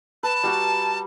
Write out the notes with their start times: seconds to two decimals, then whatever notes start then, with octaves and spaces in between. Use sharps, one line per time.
0.23 B4 A5
0.43 G3 F#4 A#5